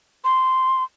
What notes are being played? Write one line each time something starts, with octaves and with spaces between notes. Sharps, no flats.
C6